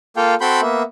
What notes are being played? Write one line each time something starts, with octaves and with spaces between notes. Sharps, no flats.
A#3 F4 A4 F5 G5
C4 F#4 A4 B5 C6 G6
A#3 B3 E5